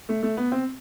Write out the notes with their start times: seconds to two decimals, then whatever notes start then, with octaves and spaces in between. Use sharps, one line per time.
0.09 A3
0.23 A3
0.37 B3
0.52 C4